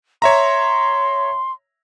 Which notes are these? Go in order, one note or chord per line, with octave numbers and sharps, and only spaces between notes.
C#5 E5 A#5 C6